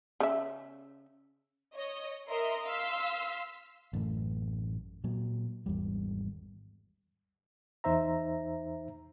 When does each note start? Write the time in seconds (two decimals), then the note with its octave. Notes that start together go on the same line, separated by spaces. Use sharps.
0.20 C#3 E5
1.74 C#5 D#5
2.29 A#4 D#5 E5 A#5 C6
2.65 F5 C6 E6 B6
3.93 A1 F#2 A2
5.04 A#2 F#3
5.66 G#1 E2 G3
7.84 E2 D#4 C5 E5 A#5